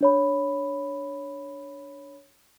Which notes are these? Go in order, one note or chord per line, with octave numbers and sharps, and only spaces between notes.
D4 C#5 B5